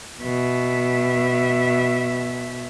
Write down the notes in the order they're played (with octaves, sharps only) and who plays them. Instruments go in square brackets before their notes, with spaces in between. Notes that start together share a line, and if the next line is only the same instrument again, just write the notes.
[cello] B2 E5